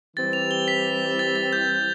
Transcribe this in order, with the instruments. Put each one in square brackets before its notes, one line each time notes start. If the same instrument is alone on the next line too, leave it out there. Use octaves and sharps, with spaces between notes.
[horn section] E3 G3 C4 G4 [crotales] A6
[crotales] F7
G7
B6
A6
A6
G6